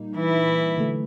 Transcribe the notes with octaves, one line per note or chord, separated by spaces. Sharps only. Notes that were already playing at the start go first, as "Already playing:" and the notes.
Already playing: A#2 G3 A#3 D#4
E3 E4
D3 F#3 A3